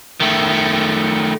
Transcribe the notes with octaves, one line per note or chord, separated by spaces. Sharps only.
D#3 A3